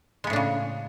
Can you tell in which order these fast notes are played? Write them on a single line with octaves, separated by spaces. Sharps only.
G#3 B3 A2 D4 C#3